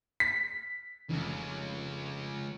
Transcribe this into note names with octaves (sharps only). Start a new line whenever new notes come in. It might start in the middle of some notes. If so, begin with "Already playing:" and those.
B6
F1 C#2